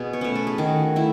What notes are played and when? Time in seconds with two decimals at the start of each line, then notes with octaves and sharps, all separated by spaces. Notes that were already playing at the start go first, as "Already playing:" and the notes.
Already playing: B2 G#4
0.13 C#5
0.21 A3 C#4 B4
0.35 A4
0.47 G#4
0.58 D#3 F#4
0.96 A3 E4